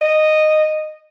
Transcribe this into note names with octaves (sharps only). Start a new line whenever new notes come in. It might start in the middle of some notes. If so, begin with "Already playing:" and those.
D#5